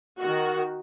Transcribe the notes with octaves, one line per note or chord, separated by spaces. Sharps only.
D#3 F#4